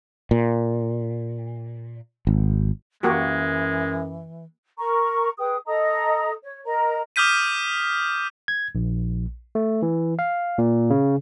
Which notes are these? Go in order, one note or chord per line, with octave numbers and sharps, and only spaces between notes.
A#2
G#1
F#2 E3 G#3 A#3 F#4 G4
A#4 A#5 C#6
G#4 B4 G5 D#6
A4 D#5 A#5 D#6
C#5
A#4 D#5 A#5
D6 D#6 F6 G6 B6 D#7
G#6
A#1
A3
E3
F5
A#2
C#3